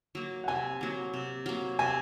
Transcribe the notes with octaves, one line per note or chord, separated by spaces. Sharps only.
F#3 A#3
F#5
C3 G#5
F#3 A#3
C3
F#3 A#3
C3 G#5